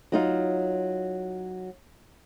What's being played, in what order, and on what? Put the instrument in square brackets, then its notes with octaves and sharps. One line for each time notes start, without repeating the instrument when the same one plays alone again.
[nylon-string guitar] F#3 D#4 F4